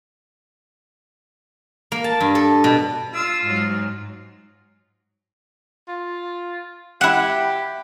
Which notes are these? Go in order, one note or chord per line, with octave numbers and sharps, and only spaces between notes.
A#3
A5
G2
A4
B2
F4 E6
G#2 F#3
F4
E4 G4 F#5